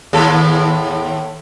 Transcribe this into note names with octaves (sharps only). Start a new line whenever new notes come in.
D#2 A2 A4